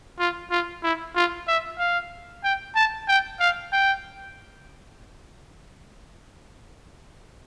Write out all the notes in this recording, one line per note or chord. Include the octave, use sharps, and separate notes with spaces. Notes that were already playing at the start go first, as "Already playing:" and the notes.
F4
F4
E4
F4
E5
F5
G5
A5
G5
F5
G5